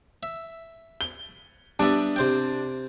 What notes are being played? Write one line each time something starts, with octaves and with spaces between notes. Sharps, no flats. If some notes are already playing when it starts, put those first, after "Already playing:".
E5
G7
G3 B3 D4 E5
C3 C5 G5